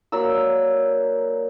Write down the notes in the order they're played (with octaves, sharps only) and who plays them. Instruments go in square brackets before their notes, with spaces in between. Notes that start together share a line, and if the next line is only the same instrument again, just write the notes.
[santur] F#3 A#3 D5 E6